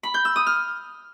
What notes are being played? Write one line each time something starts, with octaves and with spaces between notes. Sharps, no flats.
B5
G6
E6
D#6
F6